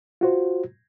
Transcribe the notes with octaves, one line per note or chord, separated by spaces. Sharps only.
F4 F#4 C5